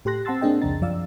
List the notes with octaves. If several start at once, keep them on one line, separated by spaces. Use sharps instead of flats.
A2 G4 A4 C6 F#6 A#6
C4 F#5 A5 C6 E6 A6
A#3 C4 D4 G#4 D#5 G5
C2 F2 C#3 D4 A#5 A6
F#2 F3 D5 F5 E6